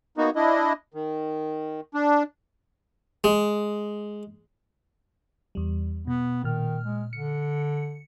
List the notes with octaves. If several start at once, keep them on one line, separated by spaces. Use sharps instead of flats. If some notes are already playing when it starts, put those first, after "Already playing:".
A#3 B3 D#4 F#4
D4 E4 D#5
D#3
D4
G#3
E2 G3
B2 B3
A#2 D#3 F6
G#3
D3 C#7